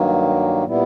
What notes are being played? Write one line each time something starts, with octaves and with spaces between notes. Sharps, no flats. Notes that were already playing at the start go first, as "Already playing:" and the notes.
Already playing: G2 D#3 F#3 A#3
A#2 G3 B3 E4